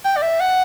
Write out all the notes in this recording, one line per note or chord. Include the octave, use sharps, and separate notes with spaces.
G5
D5
E5
F#5